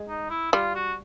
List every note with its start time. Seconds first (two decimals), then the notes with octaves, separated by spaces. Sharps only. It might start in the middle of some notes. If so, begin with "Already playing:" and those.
Already playing: G#3
0.08 D#4
0.30 E4
0.52 G3 F4
0.75 F#4